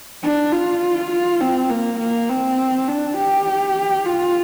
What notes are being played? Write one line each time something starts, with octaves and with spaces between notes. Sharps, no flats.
D4
F4
F4
C4
A#3
A#3
C4
D4
G4
F4